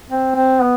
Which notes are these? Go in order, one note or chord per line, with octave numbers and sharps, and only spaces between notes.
C4
C4
B3